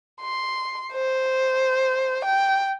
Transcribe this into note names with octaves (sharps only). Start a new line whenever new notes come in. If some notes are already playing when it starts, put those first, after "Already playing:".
C6
C5
G5